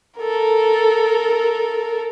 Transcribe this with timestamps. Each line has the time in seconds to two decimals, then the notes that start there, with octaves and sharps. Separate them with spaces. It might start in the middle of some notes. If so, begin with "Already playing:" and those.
0.19 A4 A#4